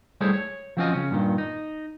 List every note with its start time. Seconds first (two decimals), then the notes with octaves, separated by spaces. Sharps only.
0.21 G3 A3 E4 G#4 C5 C#5
0.33 C#5
0.77 F3 F#3 C4 C#4 F4 D#5
0.93 C#3 C#4
1.11 G2 A#2 D#3
1.38 D#4